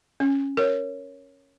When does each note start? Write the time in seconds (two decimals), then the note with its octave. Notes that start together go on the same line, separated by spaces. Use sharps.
0.20 C#4
0.57 A#4 C#5